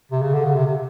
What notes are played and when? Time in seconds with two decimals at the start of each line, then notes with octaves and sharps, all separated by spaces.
0.11 C3
0.22 C#3
0.33 D3
0.44 C#3
0.56 C3
0.66 C3